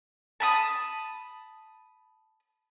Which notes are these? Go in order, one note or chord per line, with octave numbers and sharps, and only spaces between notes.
A5 B5 D#6